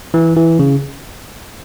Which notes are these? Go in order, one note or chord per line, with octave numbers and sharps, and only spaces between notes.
E3
E3
C#3